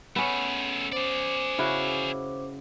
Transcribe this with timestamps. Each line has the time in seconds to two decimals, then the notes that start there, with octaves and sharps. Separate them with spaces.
0.16 A3 B3 C#4 G#4
0.92 G#4 C5 D5 D6
1.59 C#3 E4 F#4